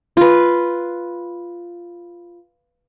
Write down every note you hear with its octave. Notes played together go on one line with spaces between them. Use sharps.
F4 B4